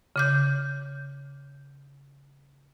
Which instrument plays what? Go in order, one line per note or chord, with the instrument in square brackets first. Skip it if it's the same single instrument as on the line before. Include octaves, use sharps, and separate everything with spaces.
[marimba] C#3 D6 G6